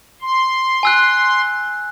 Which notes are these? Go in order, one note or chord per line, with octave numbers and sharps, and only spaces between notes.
C6
G#5 E6 F#6